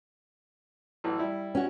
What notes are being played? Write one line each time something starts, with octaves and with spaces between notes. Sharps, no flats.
A1 E3 F#3
G3 E4
C#4 F#4